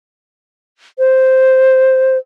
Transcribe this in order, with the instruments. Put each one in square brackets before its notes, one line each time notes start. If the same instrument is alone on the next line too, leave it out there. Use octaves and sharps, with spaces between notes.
[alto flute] C5